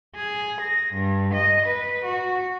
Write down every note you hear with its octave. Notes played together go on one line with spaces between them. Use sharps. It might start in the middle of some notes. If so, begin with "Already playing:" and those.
G#4
A#6
G2
D#5
B4
F#4